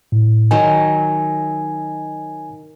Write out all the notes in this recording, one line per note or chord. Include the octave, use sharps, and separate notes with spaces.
A2
D#3 F#3 G#5